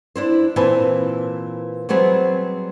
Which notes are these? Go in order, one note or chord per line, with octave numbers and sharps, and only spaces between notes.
D4 E4 C5
A#2 E3 C4 B4 G#5 A5
F#3 G3 B3 C4 G#4